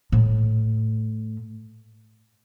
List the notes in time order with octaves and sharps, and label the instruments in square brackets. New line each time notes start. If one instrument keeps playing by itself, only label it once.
[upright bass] A2